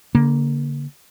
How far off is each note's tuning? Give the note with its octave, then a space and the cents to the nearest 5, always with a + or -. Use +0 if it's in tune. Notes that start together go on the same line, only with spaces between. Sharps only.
D3 -40 A#3 +0